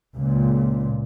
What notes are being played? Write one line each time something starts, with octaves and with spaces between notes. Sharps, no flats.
C#2 A#2